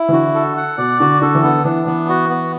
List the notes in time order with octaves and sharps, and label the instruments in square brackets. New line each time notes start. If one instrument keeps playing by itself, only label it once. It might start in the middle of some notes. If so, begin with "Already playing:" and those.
Already playing: [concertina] E4
[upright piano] E3
[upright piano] D3 [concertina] F#4
[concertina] A4
F#5
[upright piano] B2 [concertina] D5
[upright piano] D3 [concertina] F#4
[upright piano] D3 [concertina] A4
[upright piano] E3
[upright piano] D3 [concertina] B3
[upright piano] E3 [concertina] D4
[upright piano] E3 [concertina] B3
[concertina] F#4
B3